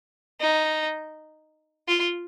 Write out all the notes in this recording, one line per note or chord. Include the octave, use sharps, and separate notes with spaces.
D#4
F4